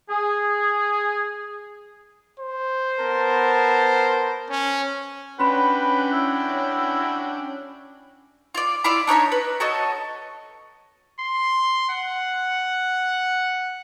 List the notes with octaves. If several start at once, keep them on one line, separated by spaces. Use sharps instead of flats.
G#4
C5
B3 A#4 A5
C#4
C#4 D4 F#4 B4 G5 B5 C6
E4
F4 D5
E4 F4 D5
D4 D#4 C#5 B5
B4
F#4 A4 C#5 D#5
C6
F#5